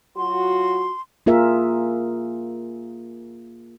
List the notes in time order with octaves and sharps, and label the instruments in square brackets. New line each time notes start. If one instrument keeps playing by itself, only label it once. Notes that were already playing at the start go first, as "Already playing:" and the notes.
[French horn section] F#3 F4 F#4 [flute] C6
[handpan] A#3 F4 G#4 A#4 E5